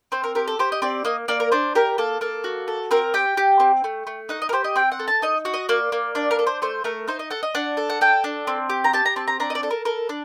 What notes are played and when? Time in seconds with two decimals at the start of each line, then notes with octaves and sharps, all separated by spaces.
0.12 C4 C5
0.24 A#4
0.35 G4 A#4
0.48 A4
0.59 G4 C5
0.72 D#5
0.82 C4 D5
1.05 A#3 D#5
1.28 A#3 D5
1.40 A#4
1.52 D4 C5
1.75 G4 A#4
1.98 A#3 A4
2.21 A#3 A4
2.44 F#4
2.68 A4
2.91 C4 A#4
3.14 G4 G5
3.37 G4
3.60 C4
3.84 A3
4.07 A3
4.29 D#4 F#5
4.42 D#5
4.49 A#4
4.53 G4 C5
4.64 D#5
4.76 C4 G5
4.92 F#5
4.99 A4
5.08 A5
5.22 D#4 D#5
5.45 F#4
5.54 D#5
5.69 A#3 D5
5.92 A#3
6.15 D4 D5
6.31 A#4
6.39 A4
6.47 C5
6.62 A3 C5
6.84 A3 A#4
7.08 D#4 C5
7.19 D#5
7.30 A4 F#5
7.43 D#5
7.55 D4 F#5
7.77 A4
7.90 F#5
8.01 A4 G5
8.24 D4
8.47 C4
8.70 G4
8.84 A#5
8.93 G4 A5
9.05 A#5
9.16 C4 A5
9.27 A#5
9.40 D4 A#5
9.50 D#5
9.55 D5
9.63 A4
9.71 A#4
9.85 A4 A#4
10.09 D4